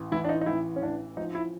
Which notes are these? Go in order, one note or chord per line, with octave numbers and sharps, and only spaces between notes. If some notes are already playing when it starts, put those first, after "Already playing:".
Already playing: A1
E3 E4
D4
D#4
D#4
A1 E4
C#4
A1 D4
F3 D#4
E4